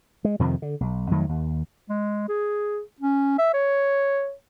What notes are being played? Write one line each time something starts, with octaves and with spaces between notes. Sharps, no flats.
G#3
F2 C3 D#3 F3
D3
B1
F2 D#3 F#3 A3
D#2
G#3
G#4
C#4
E5
C#5